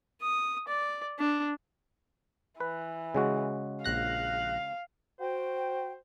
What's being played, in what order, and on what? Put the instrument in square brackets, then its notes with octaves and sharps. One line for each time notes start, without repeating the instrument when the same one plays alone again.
[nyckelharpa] D#6
D5
D4
[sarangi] E3 [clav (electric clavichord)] B4
[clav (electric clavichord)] C#3 G#3 F#4
[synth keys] A#1 F#6 A#6 [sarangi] F5
[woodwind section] F#4 G5 [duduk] C5